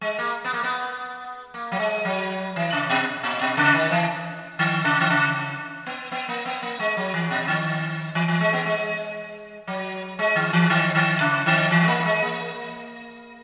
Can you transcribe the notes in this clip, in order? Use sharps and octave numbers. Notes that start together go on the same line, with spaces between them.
G#3
A#3
B3
A#3
B3
A#3
F#3
G#3
F#3
E3
C#3
B2
A#2
B2
C#3
D#3
E3
D#3
C#3
D#3
C#3
B3
B3
A#3
B3
A#3
G#3
F#3
E3
B2
D#3
E3
E3
G#3
B3
G#3
F#3
G#3
D#3
E3
D#3
D#3
C#3
D#3
E3
G#3
A#3
G#3
A#3